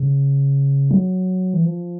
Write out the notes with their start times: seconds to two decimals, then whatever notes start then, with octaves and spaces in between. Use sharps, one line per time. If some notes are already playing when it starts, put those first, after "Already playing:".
Already playing: C#3
0.91 F#3
1.54 E3
1.65 F3